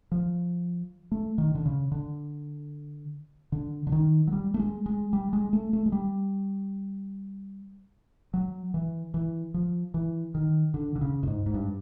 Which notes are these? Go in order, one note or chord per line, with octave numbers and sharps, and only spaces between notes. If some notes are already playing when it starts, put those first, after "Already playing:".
F3
A3
D#3
D3
C#3
D3
D3
D3
D#3
F#3
G3
A3
G#3
G#3
G3
G#3
A3
A3
G#3
G3
F#3
E3
E3
F3
E3
D#3
D3
D3
C#3
A2
G#2
G#2
G2